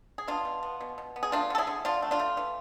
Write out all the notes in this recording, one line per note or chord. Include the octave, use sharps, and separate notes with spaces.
G#4
B2 D4 F4
B2
B3
B2
B2
B3
G#4
A3 D4 F4
D3 A4
E4 G#4
D3
D3 D4 F4
A3
D4 F4
A3
E3